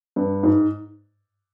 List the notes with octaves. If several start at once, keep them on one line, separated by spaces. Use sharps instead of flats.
G2
G#2